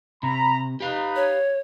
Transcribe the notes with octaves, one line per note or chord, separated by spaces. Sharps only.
C3 A#5 B5
D#4 G4 B4 F5
C#5